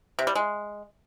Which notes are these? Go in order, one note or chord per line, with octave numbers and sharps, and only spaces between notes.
C3
G3
G#3